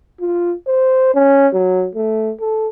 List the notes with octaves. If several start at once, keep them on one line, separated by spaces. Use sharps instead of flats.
F4
C5
C#4
F#3
A3
A4